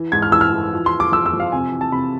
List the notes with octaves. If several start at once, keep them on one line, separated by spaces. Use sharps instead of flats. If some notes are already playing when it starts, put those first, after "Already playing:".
Already playing: E3
G#2 G#6
F6
E3 E6
F6
E3
F3
C6
F3
D6
F2 E6
E6
F2
F5
C3 G#5
E3
A5
C3 B5